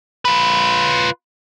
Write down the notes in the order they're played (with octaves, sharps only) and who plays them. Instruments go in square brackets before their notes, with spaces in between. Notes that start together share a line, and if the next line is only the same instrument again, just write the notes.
[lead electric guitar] F4 B4